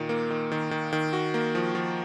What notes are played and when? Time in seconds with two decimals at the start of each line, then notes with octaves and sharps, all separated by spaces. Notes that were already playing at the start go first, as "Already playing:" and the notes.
Already playing: A#2 D#3
0.09 A#3
0.30 D#3
0.52 D#3
0.71 D#3
0.93 D#3
1.13 F#4
1.34 A#3
1.55 F3
1.75 F3